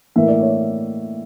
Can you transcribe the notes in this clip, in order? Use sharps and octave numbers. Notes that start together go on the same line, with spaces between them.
A2 E3 A#3 E5
D5
C#5